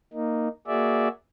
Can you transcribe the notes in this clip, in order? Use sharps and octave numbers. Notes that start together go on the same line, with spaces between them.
A#3 D#4
A#3 F#4 G#4 D5 E5